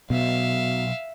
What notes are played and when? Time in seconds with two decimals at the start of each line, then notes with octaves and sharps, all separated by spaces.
0.10 B1 B2 E5 F5